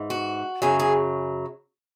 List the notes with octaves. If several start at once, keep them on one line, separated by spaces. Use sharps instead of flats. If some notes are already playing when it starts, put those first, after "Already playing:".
Already playing: G#2 E3
F#4
F#2 C#3 F#3 G#4
G#4